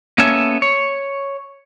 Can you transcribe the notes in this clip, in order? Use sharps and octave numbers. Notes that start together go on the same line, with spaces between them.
A#3 B3 C#4 A4 C#5 E5
C#5